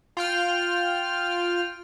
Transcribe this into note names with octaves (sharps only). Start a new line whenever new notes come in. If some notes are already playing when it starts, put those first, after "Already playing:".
F4 G5 F6